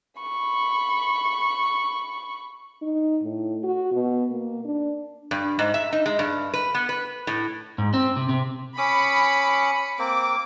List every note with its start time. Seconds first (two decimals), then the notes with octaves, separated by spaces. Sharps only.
0.21 B5 C#6
2.82 D#4
3.23 A2
3.63 F#4
3.93 B2
4.31 A#3
4.64 D4
5.31 G2
5.59 G#2
5.74 E5
5.93 D#4
6.06 G#3
6.19 G2
6.54 B4
6.75 B3
6.89 B4
7.27 A2
7.78 G#2
7.94 C4
8.17 C3
8.29 C3
8.78 C#4 B5 D6 D#6 C#7
9.99 A#3 C4 D6